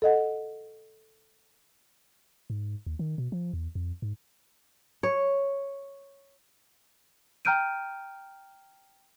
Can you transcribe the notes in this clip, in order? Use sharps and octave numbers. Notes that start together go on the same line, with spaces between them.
A4 D#5 F#5
G#2
D#2
D#3
B2
F3
E2
F2
G#2
C#5
G5 A#5 F6 G6 D7 D#7